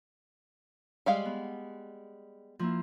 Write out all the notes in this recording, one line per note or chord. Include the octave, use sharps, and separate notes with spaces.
G3 G#3 F5
B3
F3 A#3 E4